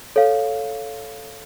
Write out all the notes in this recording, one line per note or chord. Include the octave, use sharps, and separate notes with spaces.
A4 C#5 F5